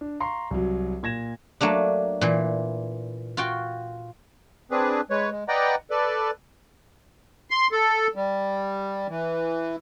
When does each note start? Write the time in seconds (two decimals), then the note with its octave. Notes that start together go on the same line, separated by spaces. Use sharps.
0.01 D4
0.20 F5 A#5 C6 C#6 C7
0.51 C2 F#3
1.03 A#2 G#6 A#6 E7
1.61 F#3 A3 A#3 D4
2.21 A#2 E3
3.37 F4 F#4 G5
4.71 C4 D4 G#4 B4
5.10 G#3 B4 C#5
5.31 G#3
5.48 B4 D5 D#5 F#5 G5 A#5
5.91 A4 B4 D5
7.51 C6
7.72 A4
8.15 G3
9.08 E3